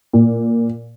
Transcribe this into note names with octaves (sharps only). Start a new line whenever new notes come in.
A#2